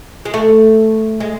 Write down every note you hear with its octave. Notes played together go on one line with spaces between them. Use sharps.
G#3
A3
G#3